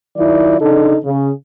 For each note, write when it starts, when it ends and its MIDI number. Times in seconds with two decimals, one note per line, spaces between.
0.17 0.60 51
0.17 0.60 54
0.17 0.60 64
0.17 0.60 65
0.17 0.60 74
0.61 0.96 49
0.61 0.96 62
0.61 0.96 63
0.61 0.96 69
1.04 1.31 49